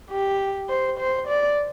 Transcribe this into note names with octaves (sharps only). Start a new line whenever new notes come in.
G4
C5
C5
D5